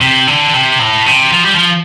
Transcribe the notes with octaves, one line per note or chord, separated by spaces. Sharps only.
C3
D3
C3
A2
C3
F3
G3
F3